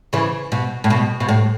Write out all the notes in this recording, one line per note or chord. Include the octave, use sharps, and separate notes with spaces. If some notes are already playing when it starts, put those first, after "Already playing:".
C#3 E3
B2
A2
B2
B2
A2